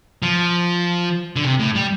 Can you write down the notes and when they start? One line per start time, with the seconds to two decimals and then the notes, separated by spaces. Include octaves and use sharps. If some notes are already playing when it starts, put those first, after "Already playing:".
0.22 F3
1.36 D3
1.44 C3
1.59 A2
1.75 G3